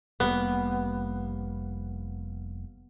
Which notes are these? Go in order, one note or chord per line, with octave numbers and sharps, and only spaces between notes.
F1 G3 A#3 B3